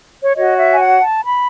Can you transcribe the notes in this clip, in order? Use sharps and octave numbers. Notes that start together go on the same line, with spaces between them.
C#5
F#4 C#5 D#5
E5
G#5
F#5
A5
B5